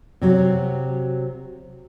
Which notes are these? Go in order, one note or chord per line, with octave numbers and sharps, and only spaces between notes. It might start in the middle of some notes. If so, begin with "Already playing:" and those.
C3 F#3